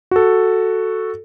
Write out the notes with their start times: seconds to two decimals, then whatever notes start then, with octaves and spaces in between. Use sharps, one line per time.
0.11 F#4 A4